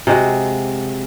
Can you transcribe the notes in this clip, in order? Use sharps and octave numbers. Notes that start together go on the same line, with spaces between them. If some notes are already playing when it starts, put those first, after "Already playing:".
C3 G#3 F#4